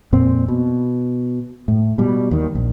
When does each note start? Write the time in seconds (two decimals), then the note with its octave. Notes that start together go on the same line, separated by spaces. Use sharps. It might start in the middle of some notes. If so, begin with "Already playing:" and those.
0.13 F2 A#2 C4
0.48 B2
1.68 A2
1.98 B2 G3
2.31 D#2 D#3
2.55 A#1